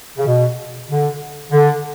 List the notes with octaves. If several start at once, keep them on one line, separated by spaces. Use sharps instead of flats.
C#3
B2
D3
D3